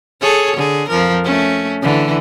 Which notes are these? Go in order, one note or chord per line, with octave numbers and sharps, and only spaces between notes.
G#4 A4 C#5
D3 G#4
F2 F3 A#4
A3 C#4
D3 E3